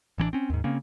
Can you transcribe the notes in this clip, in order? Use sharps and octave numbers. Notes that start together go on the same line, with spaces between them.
A1 E3 B3 D4
C4 C#4
D#2 G#2
C#3 A#3 C4 C#4